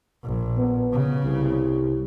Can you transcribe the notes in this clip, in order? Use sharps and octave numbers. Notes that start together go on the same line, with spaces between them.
A#1
B3
C#3
C2